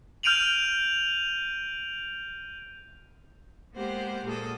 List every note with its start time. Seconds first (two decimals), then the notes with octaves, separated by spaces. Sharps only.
0.23 F6 G6 D7 D#7 F7 F#7
3.75 G#3 A#3 B3 G4 C5 F#5
4.24 A#2 A#3 G#4 A4 D#6